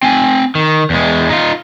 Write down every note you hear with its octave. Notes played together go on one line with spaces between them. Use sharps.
C4 G#5
D#3
E2 G#3
D#4 F4